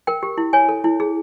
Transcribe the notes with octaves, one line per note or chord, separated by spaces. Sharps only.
A#4 G5
G4
E4
C#5 G#5
A4
E4
G#4